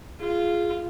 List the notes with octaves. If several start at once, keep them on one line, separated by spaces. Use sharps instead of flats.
F4 G#4